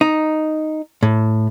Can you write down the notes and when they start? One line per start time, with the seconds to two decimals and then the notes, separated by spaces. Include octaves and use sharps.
0.01 D#4
1.03 A2